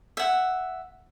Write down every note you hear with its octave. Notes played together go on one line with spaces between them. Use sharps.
E5 F#5